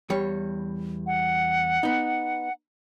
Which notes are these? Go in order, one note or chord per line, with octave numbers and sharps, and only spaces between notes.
E2 G3 C#5
F#5
B3 D#4